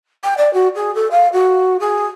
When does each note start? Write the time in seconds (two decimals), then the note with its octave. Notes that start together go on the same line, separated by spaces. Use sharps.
0.24 G5
0.37 D5
0.53 F#4
0.75 G#4
0.95 A4
1.11 F5
1.32 F#4
1.79 G#4